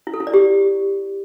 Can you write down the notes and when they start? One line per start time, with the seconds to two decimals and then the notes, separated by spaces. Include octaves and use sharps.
0.07 E4
0.14 A4
0.20 E4
0.27 D5
0.34 G4